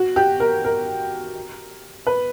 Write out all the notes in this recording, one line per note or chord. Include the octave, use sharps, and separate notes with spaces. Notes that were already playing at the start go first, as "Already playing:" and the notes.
Already playing: F#4
G4
A#4
A#4
B4